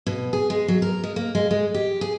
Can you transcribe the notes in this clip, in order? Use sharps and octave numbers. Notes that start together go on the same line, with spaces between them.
B2
G#4
G#3
F#3
A#4
G#3
A#3
G#3
G#3
G4
G#4